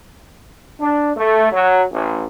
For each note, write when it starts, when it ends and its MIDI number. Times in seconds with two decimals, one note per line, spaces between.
0.81 1.12 62
1.17 1.52 57
1.52 1.83 54
1.92 2.25 33